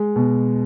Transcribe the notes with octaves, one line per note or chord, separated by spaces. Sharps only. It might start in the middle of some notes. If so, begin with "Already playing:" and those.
Already playing: G#3
B2